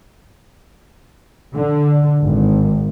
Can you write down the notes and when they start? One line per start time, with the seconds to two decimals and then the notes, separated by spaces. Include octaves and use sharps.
1.55 D3
2.22 G#1